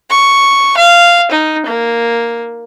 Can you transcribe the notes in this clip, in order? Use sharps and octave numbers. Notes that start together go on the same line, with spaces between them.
C#6
F5
D#4
A#3